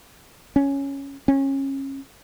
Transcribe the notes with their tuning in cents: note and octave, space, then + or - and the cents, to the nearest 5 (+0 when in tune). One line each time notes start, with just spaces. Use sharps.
C#4 +0
C#4 -25